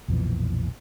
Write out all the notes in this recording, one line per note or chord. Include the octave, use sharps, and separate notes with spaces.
B1 F2 A#2 E3